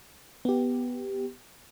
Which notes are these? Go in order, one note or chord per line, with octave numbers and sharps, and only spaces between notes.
B3 G4